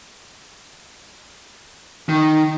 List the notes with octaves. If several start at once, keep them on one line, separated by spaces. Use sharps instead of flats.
D#3